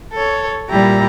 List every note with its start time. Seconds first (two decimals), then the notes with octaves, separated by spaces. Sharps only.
0.13 A4 C#5
0.69 A#2 G3 E4 G4 A#5